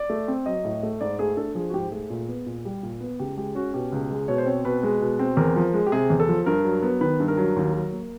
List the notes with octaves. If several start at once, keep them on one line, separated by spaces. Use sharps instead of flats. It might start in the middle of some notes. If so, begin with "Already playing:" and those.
Already playing: D5
A3
C4
F#3 D#5
A2
A3
G#2 D5
A3 G#4
D4 A4
F3 G#4
F#4
G#2 G4
A3 G#4
A#2
B3
A#2
G3
A#2
B3
C#2 G4
G#3 G4
C#4 F#4
B2 G4
C#2
G#3
B2 C#5
C5
C4 C#5
B2 B4
G#3
B2
C4
E2 A#4
F3
G#3
G4
C3 G#4
E2
A4
F3
G2 A#4
F#3
B3
D#3 B4
G2
A#4
F#3
D#2
F#3
A#3